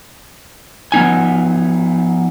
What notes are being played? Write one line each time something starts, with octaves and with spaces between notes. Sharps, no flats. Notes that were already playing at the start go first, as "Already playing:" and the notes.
F3 B3 D#4 G#5